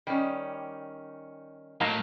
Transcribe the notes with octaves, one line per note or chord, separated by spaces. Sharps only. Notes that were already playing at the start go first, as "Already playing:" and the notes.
D#3 G3 C#4
A2 F#3 A#3 D#4 F5